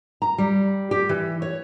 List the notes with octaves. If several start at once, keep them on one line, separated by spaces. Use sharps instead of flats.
A#5
G3
G4
E3
C#5